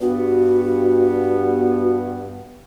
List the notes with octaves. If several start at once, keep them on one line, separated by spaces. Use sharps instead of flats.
G2 B3 F#4